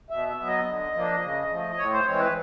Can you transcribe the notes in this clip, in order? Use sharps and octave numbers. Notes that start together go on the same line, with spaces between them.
B2 E5
E5
F#3 B3
D#5
D3
F3 A#3 D4
C#3
F3 A3
A2 C#5
C5
E3 G#3 C4 C#5
B4